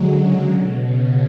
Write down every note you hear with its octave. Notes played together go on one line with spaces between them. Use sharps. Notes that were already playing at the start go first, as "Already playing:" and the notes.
Already playing: D3 F#3 G#3
C#3
B2
C#3